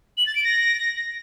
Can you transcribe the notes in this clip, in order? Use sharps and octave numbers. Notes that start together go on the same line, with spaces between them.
F#7
A6
D7
A#6